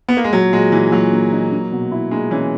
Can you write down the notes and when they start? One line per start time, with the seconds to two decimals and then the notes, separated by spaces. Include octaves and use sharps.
0.09 B3
0.17 A#3
0.24 G#3
0.33 A#2 F#3
0.53 A#2 G#3
0.72 A#2 E3
0.92 A#2 F#3
1.13 A#3
1.32 D#4
1.52 A#3
1.72 B2
1.91 E4
2.11 G#3 A#3
2.31 E3 C#4